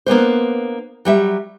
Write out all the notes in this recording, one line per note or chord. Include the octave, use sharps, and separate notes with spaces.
A#3 B3 D4 C5
F#3 G3 E5